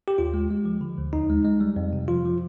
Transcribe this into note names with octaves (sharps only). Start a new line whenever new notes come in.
G4
D#2 F4
G#3
G#3
F3
D3
D2
D#2 D#4
G#3
G#3
G3
F2
C3
F3 F4
F3